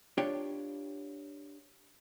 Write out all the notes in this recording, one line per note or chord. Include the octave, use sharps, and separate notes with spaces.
D4 F4 G4 C#5 G5